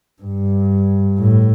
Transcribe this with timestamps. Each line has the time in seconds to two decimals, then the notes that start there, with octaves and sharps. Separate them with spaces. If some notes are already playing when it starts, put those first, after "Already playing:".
0.22 G2
1.20 A2